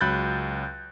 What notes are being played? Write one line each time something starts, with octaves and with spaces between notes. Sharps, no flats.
C#2 F#3 B5 F#6 G6 A6